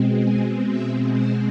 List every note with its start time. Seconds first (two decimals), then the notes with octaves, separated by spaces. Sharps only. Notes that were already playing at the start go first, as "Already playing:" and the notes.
Already playing: B2 G#3 C4
0.21 G#5
0.68 E5
1.13 C5